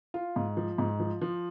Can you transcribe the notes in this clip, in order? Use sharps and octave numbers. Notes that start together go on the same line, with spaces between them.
F4
G#2
F3
G#2
F3
F3